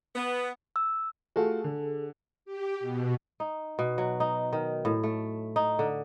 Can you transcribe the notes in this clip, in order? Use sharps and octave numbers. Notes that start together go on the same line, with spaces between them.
B3
E6
A3 F4 F#4 G#4 A4
D3
G4
B2
D#4
B2
F#3
D#4
D#3
A2
A3
D#4
D3